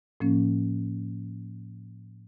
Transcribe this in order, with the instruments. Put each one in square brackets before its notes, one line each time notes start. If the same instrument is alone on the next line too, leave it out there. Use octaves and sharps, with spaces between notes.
[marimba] A2 F3 A#3 C#4